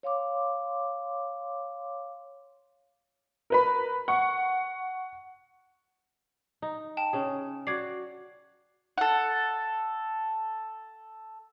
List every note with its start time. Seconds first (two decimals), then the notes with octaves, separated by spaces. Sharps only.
0.03 C#5 F5 C6 D6
3.50 A#4 B4 B5
4.08 F#5 C#6
6.62 D#4
6.97 G5 A5
7.13 C#3 C#4 G#4
7.67 F#4 D5 G#6 C7
8.98 A4 F#5